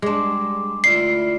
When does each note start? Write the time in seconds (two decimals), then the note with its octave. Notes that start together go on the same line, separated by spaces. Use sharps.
0.02 G3 G#3 D4 C6 D6
0.84 D2 E4 F4 D5 C7